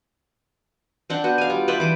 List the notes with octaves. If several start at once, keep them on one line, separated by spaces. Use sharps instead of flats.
C4 D4 F#5 G5
B3 F#4
F5 G#5
G3 F4
B4 C5 D5 E5
E3 D6